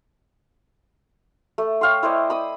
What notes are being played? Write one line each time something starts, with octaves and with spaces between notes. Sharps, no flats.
A3
C#5 F5 G5 C6
E4 C5 D5 D#5
B5 D#6